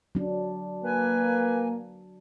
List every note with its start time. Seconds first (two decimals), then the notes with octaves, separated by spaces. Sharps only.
0.15 F#3 D4
0.84 A#3 B4 G#5